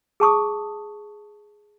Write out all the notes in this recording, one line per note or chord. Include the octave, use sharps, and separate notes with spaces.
G#4 A5 C#6 D#6